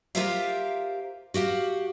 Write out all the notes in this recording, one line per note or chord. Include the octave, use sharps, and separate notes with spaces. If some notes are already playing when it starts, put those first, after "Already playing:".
F4 G4 A#4 C5 E5 F5
F#4 G4 F5 F#5